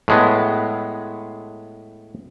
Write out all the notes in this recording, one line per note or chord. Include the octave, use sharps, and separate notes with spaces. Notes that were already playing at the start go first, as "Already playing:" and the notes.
A2 G#3 B3